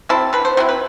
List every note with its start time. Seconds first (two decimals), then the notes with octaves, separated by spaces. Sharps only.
0.09 F#3 C4 E4 A4
0.33 D3 B4
0.45 C5
0.57 F#3 C4 E4 C5
0.69 B4